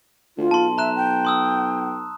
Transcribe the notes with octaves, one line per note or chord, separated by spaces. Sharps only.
D2 F4
B1 A5 C6
E5 A#5 F#6 E7
G5
C6 D#6 E6